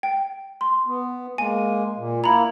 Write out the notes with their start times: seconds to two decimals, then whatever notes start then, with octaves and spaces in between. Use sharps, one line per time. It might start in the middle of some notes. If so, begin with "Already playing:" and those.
0.03 G5
0.61 C6
0.86 B3
1.38 G#3 A#3 G#5
1.97 A#2
2.24 A#3 E4 A#5 B5